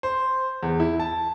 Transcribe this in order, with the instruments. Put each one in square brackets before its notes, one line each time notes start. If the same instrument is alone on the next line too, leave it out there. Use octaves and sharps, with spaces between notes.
[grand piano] C5
E2
E4
A5